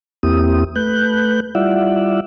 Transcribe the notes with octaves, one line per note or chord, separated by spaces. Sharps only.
E2 A#3 C4 E4 G4 D#6
A3 B4 F#6 G6
G3 E4 F4 D5 E5 F#5